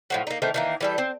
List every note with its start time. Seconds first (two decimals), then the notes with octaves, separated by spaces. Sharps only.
0.10 A2 F3 F#3
0.27 A#3 D#4
0.42 D#3 E3 A3 C4
0.54 D#3 E3 A#3
0.81 E3 G3 A4
0.98 C4